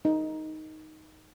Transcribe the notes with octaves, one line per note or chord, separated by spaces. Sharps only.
D#4